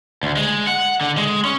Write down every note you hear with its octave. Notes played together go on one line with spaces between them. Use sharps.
D2
G#3
F#5
D3
G#3
C#4